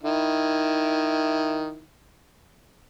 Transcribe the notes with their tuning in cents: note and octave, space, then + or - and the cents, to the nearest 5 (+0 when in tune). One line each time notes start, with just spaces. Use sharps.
D#3 +0 E4 +0